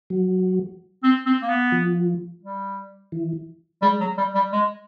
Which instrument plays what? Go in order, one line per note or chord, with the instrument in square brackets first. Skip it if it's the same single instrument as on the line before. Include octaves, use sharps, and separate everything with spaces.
[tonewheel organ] F#3
[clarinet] C4
C4
A#3
B3
[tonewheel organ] F3
[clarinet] G3
[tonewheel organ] E3
[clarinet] G3 [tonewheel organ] G#3
[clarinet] F#3
G3
G3
G#3